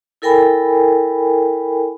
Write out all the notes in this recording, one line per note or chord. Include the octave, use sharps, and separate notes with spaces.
E4 A4 A#4 G5 G#5 B5